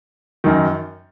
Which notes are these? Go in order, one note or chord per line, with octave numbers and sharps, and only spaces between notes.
F#2 D#3